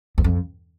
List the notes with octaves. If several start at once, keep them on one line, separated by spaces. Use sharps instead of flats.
E2
F2